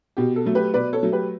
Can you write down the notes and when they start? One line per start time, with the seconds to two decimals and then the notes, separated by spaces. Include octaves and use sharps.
0.17 B2 G4
0.36 A4
0.46 F#3 A3
0.55 G4 B4
0.74 B2 B4 D5
0.93 A4 C#5
1.03 F#3 A3
1.12 G4 B4